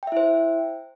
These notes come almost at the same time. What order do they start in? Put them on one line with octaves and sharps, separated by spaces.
G5 E5 E4 C5